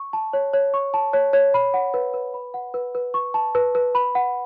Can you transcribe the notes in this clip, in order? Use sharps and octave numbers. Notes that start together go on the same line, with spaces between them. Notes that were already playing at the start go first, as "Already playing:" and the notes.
Already playing: C#6
A5
C#5
C#5
C#6
A5
C#5
C#5
B5
F#5
B4
B4
B5
F#5
B4
B4
C#6
A5
B4
B4
B5
F#5